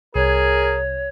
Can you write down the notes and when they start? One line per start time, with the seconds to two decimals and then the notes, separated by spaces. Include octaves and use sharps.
0.15 C2 G#4 A#4 C#5